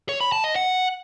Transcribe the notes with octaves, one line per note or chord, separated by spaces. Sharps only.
C#5
B5
A5
D#5
F#5